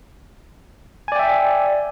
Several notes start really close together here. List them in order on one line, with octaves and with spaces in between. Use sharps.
G#5 D5 G5 E5